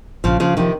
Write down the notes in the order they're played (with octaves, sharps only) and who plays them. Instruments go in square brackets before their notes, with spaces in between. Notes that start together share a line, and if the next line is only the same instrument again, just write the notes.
[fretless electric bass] A#1 [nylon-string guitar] C#3 F3
[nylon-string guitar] C#3 F3
[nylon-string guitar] C3 D#3 [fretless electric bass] F3